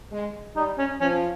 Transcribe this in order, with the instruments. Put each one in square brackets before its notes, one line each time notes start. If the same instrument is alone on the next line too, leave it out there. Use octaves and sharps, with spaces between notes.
[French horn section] G#3
[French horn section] G3 [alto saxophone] D#4
[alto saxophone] C#4
[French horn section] F3 [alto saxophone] C#4